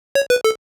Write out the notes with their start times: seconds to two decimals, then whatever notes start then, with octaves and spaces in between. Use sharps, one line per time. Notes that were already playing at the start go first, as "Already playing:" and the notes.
0.15 C#5
0.30 B4
0.44 A4